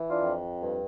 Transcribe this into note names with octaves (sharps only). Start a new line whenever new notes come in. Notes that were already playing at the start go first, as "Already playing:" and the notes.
Already playing: E3
D4 F4
F2
G2